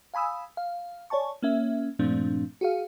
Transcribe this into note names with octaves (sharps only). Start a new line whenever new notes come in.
F5 G#5 B5 D#6 E6
F5
C#5 D5 G#5 A5 C#6
A#3 C#4 E5
G2 A#2 F3 A3 C4 D4
F#4 G#4 F5